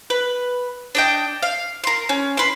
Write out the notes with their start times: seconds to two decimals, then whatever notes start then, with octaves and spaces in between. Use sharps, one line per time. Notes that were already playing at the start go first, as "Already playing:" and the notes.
0.10 B4
0.95 D4 D#5 G5
1.42 F5
1.84 A#4 C6
2.09 C#4
2.37 B4 C6